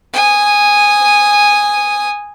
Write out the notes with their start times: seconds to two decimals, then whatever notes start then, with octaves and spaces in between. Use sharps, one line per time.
0.13 G#5 D#6